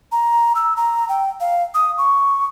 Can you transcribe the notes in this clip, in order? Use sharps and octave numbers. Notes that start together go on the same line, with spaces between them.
A#5
E6
A#5
G5
F5
D#6
C#6